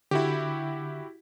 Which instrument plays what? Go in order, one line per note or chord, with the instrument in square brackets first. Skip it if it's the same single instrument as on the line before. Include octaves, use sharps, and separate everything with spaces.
[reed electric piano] D3 [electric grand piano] E4 F#4 G4